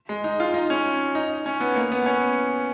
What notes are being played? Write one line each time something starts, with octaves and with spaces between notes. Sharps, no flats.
G#3
D#4
F4
D#4
C#4
D#4
C#4
B3
A#3
B3
C#4